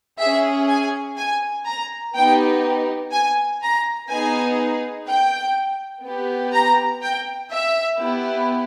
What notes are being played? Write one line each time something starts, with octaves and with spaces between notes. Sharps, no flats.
C#4 G#4 E5
G#5
G#5
A#5
B3 D#4 G4 G5
G#5
A#5
B3 D#4 G#4 G#5
G5
B3 G4
A#5
G5
E5
B3 E4 G4